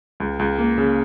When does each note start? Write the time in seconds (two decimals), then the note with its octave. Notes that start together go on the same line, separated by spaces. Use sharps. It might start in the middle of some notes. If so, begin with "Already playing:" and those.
0.20 C#2
0.39 C#2
0.59 A#3
0.78 C#3